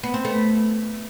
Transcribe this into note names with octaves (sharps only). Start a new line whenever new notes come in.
B3
C4
A3 B3